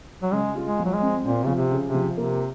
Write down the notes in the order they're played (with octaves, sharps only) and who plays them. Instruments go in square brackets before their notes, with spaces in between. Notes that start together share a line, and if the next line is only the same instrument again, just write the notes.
[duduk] F#3
[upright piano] C#3 [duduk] G#3
[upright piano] F4
[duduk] G#3
[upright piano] F3
[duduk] F#3
G#3
[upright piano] C4
[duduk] A#2 [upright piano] C4
[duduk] C#3 [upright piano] F3
[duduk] C3
[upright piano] C#3
[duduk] C3
[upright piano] F3
[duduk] C3 [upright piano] A#3